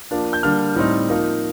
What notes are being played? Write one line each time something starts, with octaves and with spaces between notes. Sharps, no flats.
F3 A#3 D4
G6
D3 G3 A#3 D4 F6
A2 G3 C4 D#4
F3 A#3 D#4